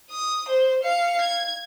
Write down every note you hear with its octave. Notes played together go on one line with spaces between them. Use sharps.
D#6
C5
F5 C#7
G#6